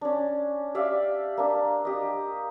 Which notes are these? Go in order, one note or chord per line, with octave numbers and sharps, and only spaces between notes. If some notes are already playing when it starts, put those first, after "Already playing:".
C#4 D4
G4 D5 E5 F5
A#3 D4
G4 D#5